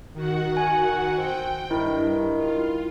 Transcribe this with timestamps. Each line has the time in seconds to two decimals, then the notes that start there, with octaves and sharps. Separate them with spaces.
0.14 D#3 F#4 F#5
0.57 G#5
1.18 C4 G5
1.71 G2 D#3 E4
2.37 F4